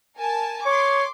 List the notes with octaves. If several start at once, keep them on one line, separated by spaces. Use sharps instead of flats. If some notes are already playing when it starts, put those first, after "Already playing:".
A#4 G#5 A5
C#5 C6 D6